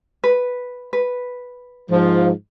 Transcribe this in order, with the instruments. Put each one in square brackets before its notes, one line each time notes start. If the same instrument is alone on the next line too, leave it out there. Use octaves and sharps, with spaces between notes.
[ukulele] B4
B4
[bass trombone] G#2 [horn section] F3